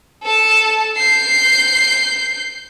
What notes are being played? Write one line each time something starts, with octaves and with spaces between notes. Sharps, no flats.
A4 A5
G6 C7